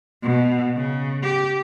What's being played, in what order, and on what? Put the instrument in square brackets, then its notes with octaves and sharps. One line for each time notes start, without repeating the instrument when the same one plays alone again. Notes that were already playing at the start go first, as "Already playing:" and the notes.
[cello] B2
C#3
G4